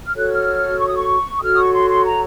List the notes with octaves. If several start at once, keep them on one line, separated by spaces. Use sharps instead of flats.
F6
F#4 A4 C#5 F#6
F6
C#6
D#6
C#6
D#6
F#4 A4 C#5 F6
D#6
C#6
C6
C6
A#5